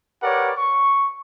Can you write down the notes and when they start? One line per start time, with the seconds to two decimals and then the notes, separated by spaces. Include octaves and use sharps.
0.23 G4 A#4 B4 C#5 D5 F#5
0.57 C#6